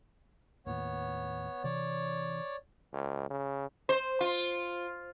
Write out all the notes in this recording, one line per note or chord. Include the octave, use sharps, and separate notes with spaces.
D#2 A2 D#3 B3 C#5
C3 E3 C#5 D5
C#2
C#3
C5
F4